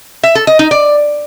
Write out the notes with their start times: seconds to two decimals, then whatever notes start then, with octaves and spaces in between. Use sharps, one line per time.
0.23 E5
0.35 A4
0.47 D#5
0.59 D#4
0.71 D5